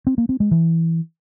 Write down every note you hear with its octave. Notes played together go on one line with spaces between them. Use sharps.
C4
A#3
C4
G#3
E3